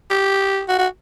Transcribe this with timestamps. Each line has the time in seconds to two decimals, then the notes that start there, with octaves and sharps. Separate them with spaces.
0.10 G4
0.69 F#4
0.79 F#4